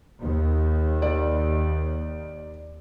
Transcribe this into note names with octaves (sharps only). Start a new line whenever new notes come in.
D#2
D5